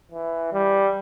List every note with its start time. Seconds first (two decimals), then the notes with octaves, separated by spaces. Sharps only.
0.12 E3
0.53 G3